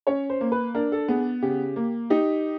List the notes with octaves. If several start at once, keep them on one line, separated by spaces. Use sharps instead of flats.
C#4 C#5
C5
A#3
B4
D4 A#4
A4
B3 G#4
C#3 G4
A#3
D#4 G4